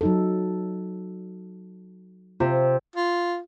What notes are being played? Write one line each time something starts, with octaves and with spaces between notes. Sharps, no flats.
F#3 D#4 A4
C3 F4
F4